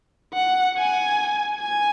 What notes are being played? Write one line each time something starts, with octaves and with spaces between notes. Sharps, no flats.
F#5
G#5
G#5